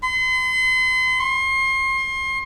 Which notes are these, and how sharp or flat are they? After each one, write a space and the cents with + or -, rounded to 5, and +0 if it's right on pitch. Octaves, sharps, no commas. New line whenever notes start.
C6 -40
C6 +30